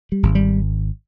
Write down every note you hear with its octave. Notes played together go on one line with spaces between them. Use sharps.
G3
G#1
G3